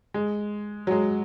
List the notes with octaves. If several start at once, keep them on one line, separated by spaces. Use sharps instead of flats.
G#3
F#3
G#3